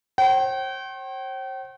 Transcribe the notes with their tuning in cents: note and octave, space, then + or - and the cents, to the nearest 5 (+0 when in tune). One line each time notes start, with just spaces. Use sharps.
C5 +45 G5 -40